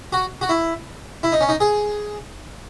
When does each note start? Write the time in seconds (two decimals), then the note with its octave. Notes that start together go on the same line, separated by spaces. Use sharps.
0.13 F#4
0.41 F#4
0.49 E4
1.23 E4
1.32 D#4
1.41 C#4
1.49 D#4
1.60 G#4